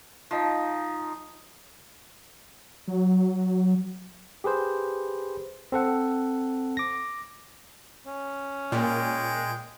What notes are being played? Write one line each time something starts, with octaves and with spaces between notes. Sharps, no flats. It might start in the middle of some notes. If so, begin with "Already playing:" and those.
F3 D#4
F#3
G4 G#4 B4 C5
C4 A4 F#5
D6 A#6
C#4
A#2 G#3 G5